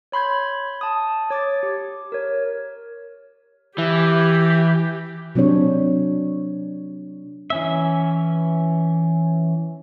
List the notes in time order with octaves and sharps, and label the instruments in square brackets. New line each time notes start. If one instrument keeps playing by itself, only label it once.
[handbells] C#5 B5 C6 G6 G#6
A5 D#6
C#5 D6 D#6 A6
G4
A#4 C#5
[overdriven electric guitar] E3 [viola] G4
[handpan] C3 F#3 C4 D4 C#5
[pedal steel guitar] E3 C#4 E5